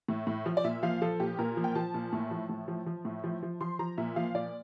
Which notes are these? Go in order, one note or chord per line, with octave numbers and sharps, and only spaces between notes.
A2
A2
F3
D5
A#2 E5
F3 F5
F3 A4
A#2 G4
A#2 A#4
F3
G5
F3 A5
A#2
A2
F3
A2
F3
F3
A2
F3
F3
F3 C6
F3 A#5
A#2 E5
F3 F5
A#2 D5